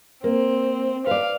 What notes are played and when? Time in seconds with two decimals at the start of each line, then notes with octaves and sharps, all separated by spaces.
0.24 A#3 C4
1.07 B4 D5 F5